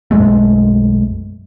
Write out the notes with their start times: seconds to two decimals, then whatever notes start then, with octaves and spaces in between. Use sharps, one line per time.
0.11 B1 F#2 G#3 A3